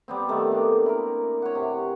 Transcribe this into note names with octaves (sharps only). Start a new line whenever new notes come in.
G3 B3 C4
D#3 A3 A4
A#3 D4
E4 A#4
C#5 F#5
C3